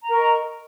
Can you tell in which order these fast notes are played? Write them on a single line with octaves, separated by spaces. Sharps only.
A#5 A#4 C#6 D#5